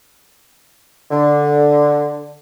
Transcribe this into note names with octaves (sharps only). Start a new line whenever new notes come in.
D3